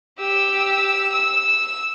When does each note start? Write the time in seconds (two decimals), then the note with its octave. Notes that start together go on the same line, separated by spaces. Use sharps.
0.19 G4 E6
1.13 E6